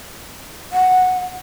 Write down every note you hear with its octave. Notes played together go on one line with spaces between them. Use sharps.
F#5